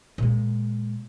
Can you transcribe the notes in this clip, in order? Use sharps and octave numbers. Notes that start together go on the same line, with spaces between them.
A#2 G#3